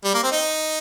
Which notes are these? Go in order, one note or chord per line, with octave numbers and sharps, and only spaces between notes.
G3
A#3
C4
D#4